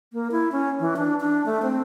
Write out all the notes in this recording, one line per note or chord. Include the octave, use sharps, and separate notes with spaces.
A#3
E4
C#4
E3
D4
D4
A3
C4